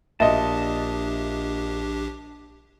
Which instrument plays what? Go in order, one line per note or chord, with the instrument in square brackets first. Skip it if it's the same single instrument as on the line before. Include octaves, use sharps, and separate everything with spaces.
[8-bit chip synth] A#1 D4 G4 [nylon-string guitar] A#2 [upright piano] D#5 E5 [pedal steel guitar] A5